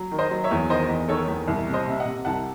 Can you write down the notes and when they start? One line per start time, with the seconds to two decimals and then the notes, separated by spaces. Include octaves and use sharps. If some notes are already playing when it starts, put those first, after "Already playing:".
Already playing: F#3
0.12 D#3
0.18 C5 D#5
0.31 F#3
0.44 C#5 E5
0.51 E2
0.69 D#3 C5 D#5
0.89 E2
1.08 D#3 A4 C#5
1.28 E2
1.48 C2
1.67 C3
1.73 C5 D#5
1.87 C3 E5
2.00 D#5 F#5
2.05 C3
2.25 C2 F#5 A5